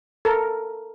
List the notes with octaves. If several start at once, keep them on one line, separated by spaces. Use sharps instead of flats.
A4 A#4